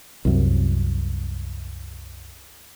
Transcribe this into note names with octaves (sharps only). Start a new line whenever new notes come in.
C2 F#2